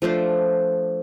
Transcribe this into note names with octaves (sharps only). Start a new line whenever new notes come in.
F3 A3 D4 C5